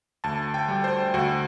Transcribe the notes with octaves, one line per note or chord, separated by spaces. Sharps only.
D2 A5
G5
G3
C5
D2 F#4